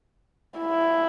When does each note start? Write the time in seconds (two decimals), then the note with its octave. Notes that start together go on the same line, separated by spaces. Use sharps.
0.60 E4